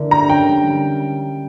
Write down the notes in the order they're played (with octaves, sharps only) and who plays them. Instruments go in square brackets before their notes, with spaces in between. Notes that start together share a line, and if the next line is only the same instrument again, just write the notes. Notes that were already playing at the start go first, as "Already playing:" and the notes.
Already playing: [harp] D3 A#3 E4
[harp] G4 [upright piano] A#5
[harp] C#4 [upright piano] G5
[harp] G3
G3